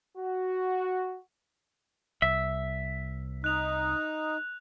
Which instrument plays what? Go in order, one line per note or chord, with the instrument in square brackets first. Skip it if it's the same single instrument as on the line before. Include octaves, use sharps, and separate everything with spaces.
[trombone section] F#4
[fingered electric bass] C2 [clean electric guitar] E5
[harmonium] D#4 [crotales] F#6 F7